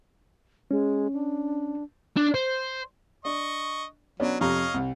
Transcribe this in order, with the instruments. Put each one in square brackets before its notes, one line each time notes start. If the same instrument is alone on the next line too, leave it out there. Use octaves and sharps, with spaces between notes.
[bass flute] G#3 [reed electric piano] C#4
[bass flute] D4
[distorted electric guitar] D4
C5
[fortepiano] D4 [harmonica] D#5 C#6
[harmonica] F#3 [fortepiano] B3 C#4 D4
[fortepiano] F2 C3 A#5 [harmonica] C#5 D#5 F5
[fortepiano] C2